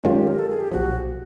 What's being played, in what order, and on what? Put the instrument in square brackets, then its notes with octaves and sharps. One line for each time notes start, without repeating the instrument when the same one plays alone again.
[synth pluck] F#2 D#3 G#3 C#4 F4 [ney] G4
[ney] A#4
A4
G#4
G4
[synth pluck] B1 A#2 F3 [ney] F#4